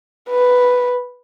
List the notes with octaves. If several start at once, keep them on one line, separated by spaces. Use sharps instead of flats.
B4